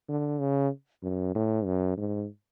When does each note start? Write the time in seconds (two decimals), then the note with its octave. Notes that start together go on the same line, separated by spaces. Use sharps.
0.09 D3
0.40 C#3
1.03 F#2
1.35 A2
1.65 F#2
1.97 G#2